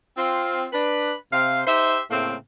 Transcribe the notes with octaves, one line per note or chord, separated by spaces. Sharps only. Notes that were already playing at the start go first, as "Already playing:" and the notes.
C4 F4
D4 B4
C3 C4 C5 F5
D#4 G4 C5 E5
A2 C#3 A3 A#3 C4